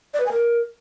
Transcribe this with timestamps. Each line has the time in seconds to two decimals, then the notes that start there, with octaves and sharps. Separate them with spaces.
0.14 D5
0.20 B4
0.26 G#5
0.32 A#4